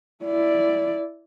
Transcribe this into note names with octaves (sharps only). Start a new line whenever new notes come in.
E4 D5